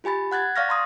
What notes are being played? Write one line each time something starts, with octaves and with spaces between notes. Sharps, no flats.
F4 G4 G#5 B5 A6
F#5 F#6 G#6 A6
D5 F5 C#6 F6 A6 A#6
A#5 C6 D#6